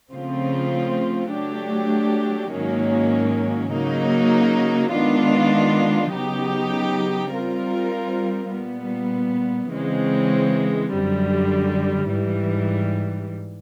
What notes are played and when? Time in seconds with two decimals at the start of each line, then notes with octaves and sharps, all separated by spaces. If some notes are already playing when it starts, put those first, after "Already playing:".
0.12 C#3 F3 A3 C4 F4
1.31 F#3 A3 D4 G4
2.51 G#2 D#3 F#3 A#3 C#4
3.72 C#3 F#3 A#3 D#4
4.91 D#3 G#3 B3 D4 F4
6.11 C#3 F#3 B3 D#4 G4
7.32 G3 C4 F4 A#4
8.51 A#2 G3 B3
9.72 C#3 E3 G#3 C4
10.92 F#2 D3 G3
12.11 G#2 E3 G3